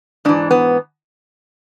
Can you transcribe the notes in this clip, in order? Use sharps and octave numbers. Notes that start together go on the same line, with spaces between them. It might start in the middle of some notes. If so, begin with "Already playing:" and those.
G#2 E3 D4
B3